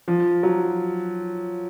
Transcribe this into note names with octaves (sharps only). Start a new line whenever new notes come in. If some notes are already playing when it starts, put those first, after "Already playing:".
F3
F#3